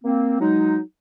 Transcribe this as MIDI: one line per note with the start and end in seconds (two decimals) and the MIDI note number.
0.04 0.37 58
0.04 0.37 60
0.41 0.80 54
0.41 0.80 56
0.41 0.80 63